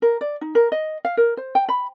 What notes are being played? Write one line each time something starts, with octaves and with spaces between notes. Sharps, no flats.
A#4
D5
D#4
A#4
D#5
F5
A#4
C5
G5
B5